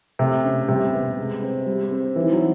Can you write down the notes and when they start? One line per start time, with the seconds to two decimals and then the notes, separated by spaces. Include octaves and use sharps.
0.19 C3 A3
0.44 C#4
0.68 C3 G3
0.93 B3
1.18 G#3
1.42 C4
1.67 G3
1.91 C4
2.16 D#3 E3
2.32 F#3